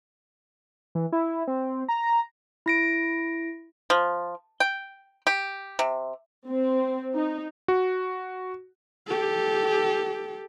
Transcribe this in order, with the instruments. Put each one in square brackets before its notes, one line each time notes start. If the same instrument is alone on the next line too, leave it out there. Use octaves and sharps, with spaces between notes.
[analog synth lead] E3
E4
C4
A#5
[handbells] E4 A#6 D7
[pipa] F3
G5
G4
C3
[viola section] C4
D#4
[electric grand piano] F#4
[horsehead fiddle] G4 A4